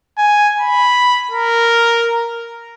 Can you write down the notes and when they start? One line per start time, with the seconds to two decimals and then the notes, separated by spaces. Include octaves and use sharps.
0.18 G#5
0.59 B5
1.31 A#4